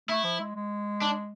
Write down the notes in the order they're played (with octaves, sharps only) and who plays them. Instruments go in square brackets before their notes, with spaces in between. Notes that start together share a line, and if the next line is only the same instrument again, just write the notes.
[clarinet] A3 [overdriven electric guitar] E4
[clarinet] F3
G#3
G#3
[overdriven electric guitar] D4